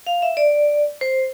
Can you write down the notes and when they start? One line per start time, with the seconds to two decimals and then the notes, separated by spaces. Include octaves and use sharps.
0.07 F5
0.22 E5
0.37 D5
1.01 C5